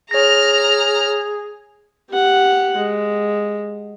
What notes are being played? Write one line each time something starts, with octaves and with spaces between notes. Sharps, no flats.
G#4 C#5 A#5 F6 A#6
G4 F#5
G#3